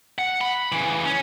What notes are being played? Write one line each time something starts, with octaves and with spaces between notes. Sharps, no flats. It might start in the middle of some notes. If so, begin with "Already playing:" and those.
F#5
B5
C#3 E3
C#4